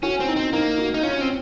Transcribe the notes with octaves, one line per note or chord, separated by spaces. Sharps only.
C#4 F#4
C4
D#4
C4
A#3 D#4
F#4
D#4
C#4 F4
C4